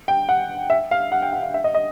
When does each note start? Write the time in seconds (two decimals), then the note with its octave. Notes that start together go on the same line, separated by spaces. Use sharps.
0.08 G5
0.29 F#5
0.70 E5
0.91 F5
1.12 F#5
1.22 G5
1.33 F#5
1.43 F5
1.54 E5
1.64 D#5
1.75 D#5